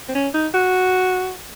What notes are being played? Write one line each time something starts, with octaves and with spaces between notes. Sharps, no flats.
C4
C#4
D#4
F#4